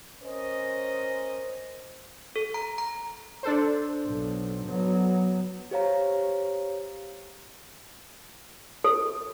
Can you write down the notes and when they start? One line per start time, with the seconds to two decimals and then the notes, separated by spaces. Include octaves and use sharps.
0.22 C#4 A#4 C5 D#5
2.36 A4
2.54 A#5
2.78 A#5
3.43 D4 A4 C5
4.06 B1
4.67 F#3 B3
5.71 G4 C5 C#5 F5 A#5
8.84 A4